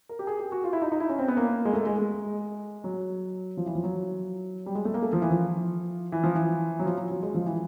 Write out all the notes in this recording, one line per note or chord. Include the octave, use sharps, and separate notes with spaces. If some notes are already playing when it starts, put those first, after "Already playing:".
A#4
G4
G#4
G4
F#4
F4
E4
D#4
D#4
E4
C#4
C4
B3
A#3
G#3
A3
G#3
G#3
F#3
F3
E3
F3
F#3
G3
G#3
A3
A#3
A3
F3
E3
F3
E3
F3
E3
F#3
F3
F#3
F#3
G#3
F3
E3